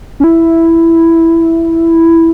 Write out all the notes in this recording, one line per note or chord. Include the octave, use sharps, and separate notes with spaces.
C#4
E4